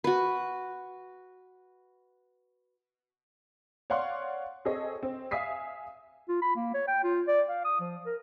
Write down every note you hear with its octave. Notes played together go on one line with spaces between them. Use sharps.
F#4 B4
C#5 D5 F5 F#5 C6
C4 G#4 A4 C#5 D#5
C4
E5 F5 G#5 D#6 B6 C7
F4
B5
A#3
C#5
G5
F4
D5
F5
D#6
F3
A#4